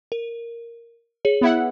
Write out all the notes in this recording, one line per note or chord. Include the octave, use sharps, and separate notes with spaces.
A#4
G#4 C#5
B3 E4 F#5